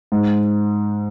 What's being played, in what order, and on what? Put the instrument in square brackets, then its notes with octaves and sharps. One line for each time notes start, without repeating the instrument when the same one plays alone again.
[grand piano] G#2